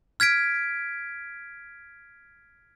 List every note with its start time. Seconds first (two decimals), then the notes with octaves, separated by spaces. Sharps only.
0.20 F6 G#6 B6 D7